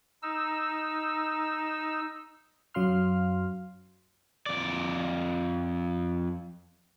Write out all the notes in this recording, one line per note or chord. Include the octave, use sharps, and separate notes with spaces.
D#4 E6
F#2 F#3 F5 C6 F6
F2 D5